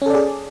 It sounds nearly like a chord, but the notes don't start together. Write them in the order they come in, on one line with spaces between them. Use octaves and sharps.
C#4 A4 D5 G#4